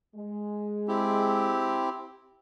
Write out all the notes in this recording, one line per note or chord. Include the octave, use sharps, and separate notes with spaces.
G#3
C4 E4 G4